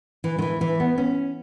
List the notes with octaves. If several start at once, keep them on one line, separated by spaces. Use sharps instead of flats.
E3
D#3
E3
E3
B3
C#4